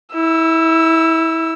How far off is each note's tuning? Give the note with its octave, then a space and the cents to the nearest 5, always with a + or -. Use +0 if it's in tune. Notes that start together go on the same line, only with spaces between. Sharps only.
E4 -25 E6 +15